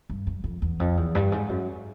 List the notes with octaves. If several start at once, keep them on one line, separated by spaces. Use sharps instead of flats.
G2
F#2
F2
E2
F2
E2
G2
G#2
F#2